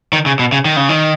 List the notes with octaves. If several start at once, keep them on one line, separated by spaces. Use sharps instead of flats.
D#3
C#3
B2
C#3
D#3
C#3
D#3